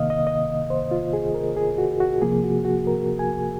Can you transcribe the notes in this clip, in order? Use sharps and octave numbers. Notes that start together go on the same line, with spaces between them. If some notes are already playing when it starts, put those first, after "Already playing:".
Already playing: C3 D#3 A#3 D#5 F5 D#6
D#5
D#5
C5
F4
G#4
A#4
G#4
F#4
F#4
C3 F3 A#3 G#4
F#4
F#4
A#4
G#5